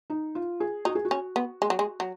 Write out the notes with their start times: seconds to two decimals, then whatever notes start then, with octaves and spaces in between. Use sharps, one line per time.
0.10 D#4
0.35 F4
0.60 G#4
0.85 D#4 F#4
0.95 G#4
1.05 F#4
1.11 C#4
1.36 B3
1.62 G#3
1.70 F#3
1.79 G#3
2.00 F#3